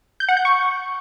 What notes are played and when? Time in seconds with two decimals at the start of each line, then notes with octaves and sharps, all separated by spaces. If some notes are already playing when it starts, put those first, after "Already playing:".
0.20 G6
0.28 F#5
0.37 G6
0.45 C#6